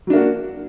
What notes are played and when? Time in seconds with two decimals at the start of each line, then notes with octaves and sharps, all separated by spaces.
0.07 F#3
0.10 D4
0.13 A#3
0.16 F#4